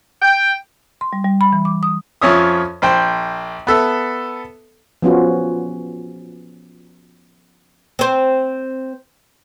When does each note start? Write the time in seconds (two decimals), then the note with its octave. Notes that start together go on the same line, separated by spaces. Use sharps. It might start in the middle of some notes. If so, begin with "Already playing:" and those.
0.22 G5
1.01 C6
1.13 G3
1.24 G3
1.41 B5
1.53 E3
1.65 D6
1.83 D#6
2.22 F2 F3 C#4 C#5 E5 D#6
2.82 A#1 C5 G5
3.67 B3 A4 E5
5.02 F3 B3 C#4 F4 F#4
7.99 C4 C5